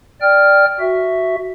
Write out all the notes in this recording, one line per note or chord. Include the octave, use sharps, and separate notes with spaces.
D5 G5 F6
F#4 E5